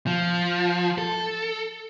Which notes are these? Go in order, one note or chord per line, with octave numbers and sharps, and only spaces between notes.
F3
A4